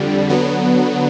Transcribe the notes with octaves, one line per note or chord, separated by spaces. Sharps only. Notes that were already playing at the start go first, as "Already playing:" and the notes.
Already playing: F2 D3 G3
D3 F#3 B3